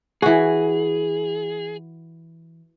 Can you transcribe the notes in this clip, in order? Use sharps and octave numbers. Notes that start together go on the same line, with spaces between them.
E3 F#4 G#4